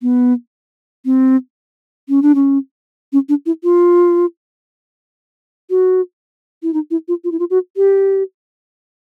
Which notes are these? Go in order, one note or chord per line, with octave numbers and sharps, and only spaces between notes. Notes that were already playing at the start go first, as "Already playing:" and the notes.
B3
C4
C#4
D4
C#4
C#4
D4
E4
F4
F#4
E4
D#4
E4
F4
F4
E4
F4
F#4
G4